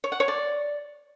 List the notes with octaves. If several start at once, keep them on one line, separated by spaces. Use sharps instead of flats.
C#5
F#5
C#5
D5